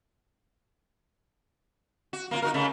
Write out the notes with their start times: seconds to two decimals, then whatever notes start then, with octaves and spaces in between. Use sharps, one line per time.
2.13 F#4
2.31 A#3 C4 F4
2.42 D#4 F#4 A#4
2.54 C#3 A3